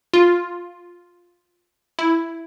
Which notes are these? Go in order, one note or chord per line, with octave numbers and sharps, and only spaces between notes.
F4
E4